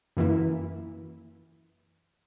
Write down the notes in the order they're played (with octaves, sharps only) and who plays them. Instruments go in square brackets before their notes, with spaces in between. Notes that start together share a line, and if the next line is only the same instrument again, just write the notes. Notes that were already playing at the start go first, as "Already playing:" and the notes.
[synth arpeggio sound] F#2 E3 A#3 E4